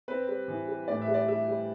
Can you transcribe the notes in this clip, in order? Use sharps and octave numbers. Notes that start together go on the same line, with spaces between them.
C4 B4
G3
E3
G3
A2 D5
E5
G3
D5
G3 E5
G3